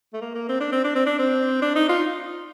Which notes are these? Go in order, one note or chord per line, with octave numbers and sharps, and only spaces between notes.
A3
A#3
A#3
C4
D4
C4
D4
C4
D4
C4
D4
D#4
F4